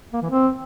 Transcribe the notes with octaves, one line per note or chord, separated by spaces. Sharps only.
A#3
E3
C4